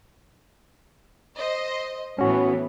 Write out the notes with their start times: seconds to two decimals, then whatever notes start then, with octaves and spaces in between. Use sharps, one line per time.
1.36 C5 D#5
2.19 A2 E3 B3 C#4 F#4